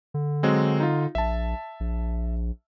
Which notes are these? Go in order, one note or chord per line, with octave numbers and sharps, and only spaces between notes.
D3
F#3 G#3 C4
D#4 F4
A#1 E5 A5
A#1